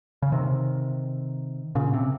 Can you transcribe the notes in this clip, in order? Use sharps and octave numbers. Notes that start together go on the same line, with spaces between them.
C#3
C3 D#3
A#2 C#3
C3